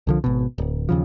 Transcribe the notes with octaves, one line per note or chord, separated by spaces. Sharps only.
C2 D3 F3
G#1 B2
D1
D#2 C#3 F3